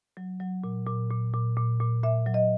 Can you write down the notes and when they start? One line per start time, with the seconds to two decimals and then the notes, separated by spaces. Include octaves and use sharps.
0.17 F#3
0.40 F#3
0.64 A#2
0.87 A#2
1.10 A#2
1.34 A#2
1.57 A#2
1.80 A#2
2.03 A#2 E5
2.26 F#3
2.34 D#5